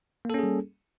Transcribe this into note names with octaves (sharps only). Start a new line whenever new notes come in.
G3 A#3 C#4 G#4 A4